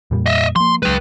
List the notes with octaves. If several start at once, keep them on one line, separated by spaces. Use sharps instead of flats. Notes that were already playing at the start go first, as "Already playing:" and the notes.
F2 A#2 G3
D#5 E5
F3 A#3 C6
C#2 F#3 G#3 B4 G5